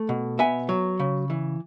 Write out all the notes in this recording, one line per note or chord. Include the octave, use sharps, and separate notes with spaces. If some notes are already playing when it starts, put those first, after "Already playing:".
Already playing: A3
B2
B3 E5 G#5
F#3
C#3
E3